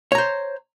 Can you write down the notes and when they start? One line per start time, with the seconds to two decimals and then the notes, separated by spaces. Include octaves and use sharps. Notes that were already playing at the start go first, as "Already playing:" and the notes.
0.12 C#5
0.15 A#5
0.18 C5